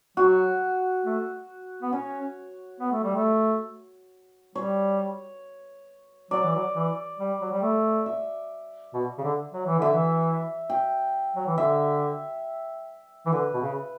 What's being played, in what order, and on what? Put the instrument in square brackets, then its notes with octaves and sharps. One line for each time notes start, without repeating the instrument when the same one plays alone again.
[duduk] F#3 [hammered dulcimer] F#4
[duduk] A3
B3
[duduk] C#4 [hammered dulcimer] C#5
[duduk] B3
A3
G3
A3
[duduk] G3 [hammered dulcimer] C#5
[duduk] F#3 [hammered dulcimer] D5
[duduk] E3
F#3
E3
G3
F#3
G3
A3
[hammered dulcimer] E5
[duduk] B2
C#3
D3
F#3
E3
[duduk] D3 [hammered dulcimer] E5
[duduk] E3
[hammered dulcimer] G5
[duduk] F#3
E3
[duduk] D3 [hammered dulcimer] E5
[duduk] E3
[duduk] D3 [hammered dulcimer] B4
[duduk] B2
C#3